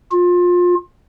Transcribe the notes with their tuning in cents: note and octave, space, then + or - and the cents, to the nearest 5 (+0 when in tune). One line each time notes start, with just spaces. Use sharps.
F4 +25